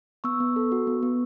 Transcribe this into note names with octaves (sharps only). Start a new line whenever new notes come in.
B3 C#6 E6
B3
A4
F#4
B3
B3